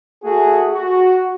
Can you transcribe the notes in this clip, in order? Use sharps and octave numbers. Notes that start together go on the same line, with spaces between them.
A3 F#4 G#4
F#4